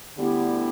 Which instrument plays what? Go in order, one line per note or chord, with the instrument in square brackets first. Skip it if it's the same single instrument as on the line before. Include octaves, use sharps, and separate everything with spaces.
[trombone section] D2 D3 [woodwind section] G3 B3 E4 G4